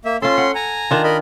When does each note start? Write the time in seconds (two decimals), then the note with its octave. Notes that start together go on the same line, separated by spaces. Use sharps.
0.05 A#3 E5
0.22 C#4 F4 A4 C6
0.38 F#5
0.55 G#5 A#5
0.91 D#3 D4 F4
1.04 A#4 D#5 B5